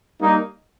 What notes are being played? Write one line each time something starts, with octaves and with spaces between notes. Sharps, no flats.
G3 A#3 D#4